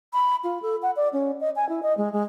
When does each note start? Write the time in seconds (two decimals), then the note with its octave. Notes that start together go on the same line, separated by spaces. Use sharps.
0.13 B5
0.44 F4
0.62 A4
0.82 F#5
0.96 D5
1.13 C#4
1.41 D#5
1.56 G#5
1.69 E4
1.83 D#5
1.97 G#3
2.13 G#3